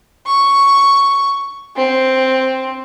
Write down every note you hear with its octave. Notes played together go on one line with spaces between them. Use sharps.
C#6
C4